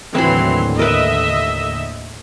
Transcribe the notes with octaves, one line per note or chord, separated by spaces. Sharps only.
D#2 A2 D3 E3 F#3 C4 B5 C6
A#4 B4 D#5 E5